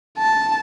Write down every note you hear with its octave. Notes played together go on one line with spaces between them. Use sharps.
A5